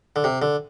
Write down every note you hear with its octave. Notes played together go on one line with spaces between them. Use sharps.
D3
C3
D3